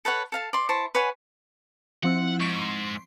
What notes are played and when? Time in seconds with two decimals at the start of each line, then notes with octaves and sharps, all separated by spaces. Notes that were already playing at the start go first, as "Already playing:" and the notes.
0.05 A4 B4 C#5 F#5
0.32 A4 F5 A5
0.53 D5 C6
0.69 E4 C5 A5 C#6
0.95 B4 C#5 F#5 G#5
2.03 F3 C4 E4 F#5
2.40 G#2 C#6 B6 D7
2.61 C6